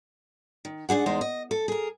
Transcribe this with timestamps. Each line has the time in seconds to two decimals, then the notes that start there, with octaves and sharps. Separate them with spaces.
0.65 D#3
0.89 G#2 D4 G#4 F#5
1.06 E2 G#3 D#4 C5
1.21 D#5
1.51 A4
1.68 G#4 A#4